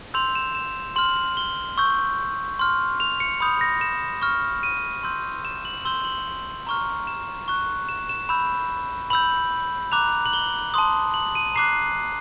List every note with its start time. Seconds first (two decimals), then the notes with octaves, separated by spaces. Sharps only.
0.14 C6 E6 G6 F7
0.35 E7
0.55 E7
0.96 C6 F6 F#7
1.37 G7
1.78 C#6 E6 G6
2.59 C6 F6
3.00 F7
3.20 C#7
3.40 B5 D#6 G6
3.61 A#6
3.81 E7
4.22 C#6 F6
4.63 D#7
5.03 C6 E6 G6
5.45 E7
5.65 F#7
5.85 C6 E6 G6 G7
6.05 F#7
6.67 A#5 C#6 F6
7.07 E7
7.48 C#6 F#6
7.89 E7
8.09 E7
8.29 B5 E6 G6 E7
9.10 B5 E6 G6 F#7
9.92 A#5 D6 F#6 F7
10.26 F#7
10.33 G7
10.74 A5 C6 D#6
11.14 F#7
11.35 D#7
11.55 A#5 D6 F#6 C7